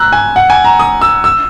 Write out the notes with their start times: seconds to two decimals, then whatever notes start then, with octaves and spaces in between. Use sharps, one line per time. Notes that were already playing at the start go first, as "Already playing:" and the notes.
Already playing: A#5 E6 F#6
0.12 G#5
0.36 F#5
0.50 G#5
0.65 A#5
0.79 D#6
1.02 E6
1.24 E6